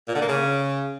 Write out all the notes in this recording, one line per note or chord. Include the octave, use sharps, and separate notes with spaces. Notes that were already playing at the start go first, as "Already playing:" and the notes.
A#2
D3
A#3
C#3